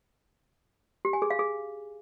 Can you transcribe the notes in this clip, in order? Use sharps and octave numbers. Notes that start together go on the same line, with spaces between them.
G4
G#5
G#4
F5
G#4